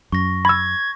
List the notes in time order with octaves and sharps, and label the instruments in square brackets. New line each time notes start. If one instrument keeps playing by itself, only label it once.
[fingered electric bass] F#2 [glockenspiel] C#6 A#6
[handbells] B5 E6 [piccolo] G#6